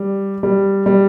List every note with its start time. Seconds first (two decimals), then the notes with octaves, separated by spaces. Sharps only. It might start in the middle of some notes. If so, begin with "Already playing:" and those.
Already playing: G3
0.43 G3
0.86 G3